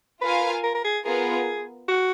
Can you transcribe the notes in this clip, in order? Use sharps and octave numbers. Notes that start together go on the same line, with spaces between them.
F4 A#4 B4 F5 G#5
A#4
A#4
G#4
B3 F4 G#4 A#4
F#4